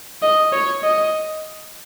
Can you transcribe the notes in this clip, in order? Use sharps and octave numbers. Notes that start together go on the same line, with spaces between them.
D#5
C#5
D#5